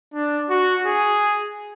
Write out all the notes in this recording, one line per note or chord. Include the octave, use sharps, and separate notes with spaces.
D4
F#4
G#4